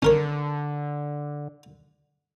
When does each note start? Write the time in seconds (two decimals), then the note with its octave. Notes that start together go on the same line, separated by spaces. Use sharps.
0.02 D3 C#4 A#4 C#5